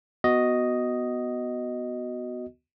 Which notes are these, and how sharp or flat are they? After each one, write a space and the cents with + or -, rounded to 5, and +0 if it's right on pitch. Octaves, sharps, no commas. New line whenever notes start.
B3 +0 F#4 +0 D#5 +0